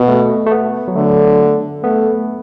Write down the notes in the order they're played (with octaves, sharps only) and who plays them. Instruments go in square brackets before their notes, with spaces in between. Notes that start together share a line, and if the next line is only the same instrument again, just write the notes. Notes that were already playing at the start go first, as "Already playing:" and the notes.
Already playing: [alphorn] B2 [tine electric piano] B3
[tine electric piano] A3
A3
B3
F#3
[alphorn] D3 [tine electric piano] A3
[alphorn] A3 [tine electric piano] B3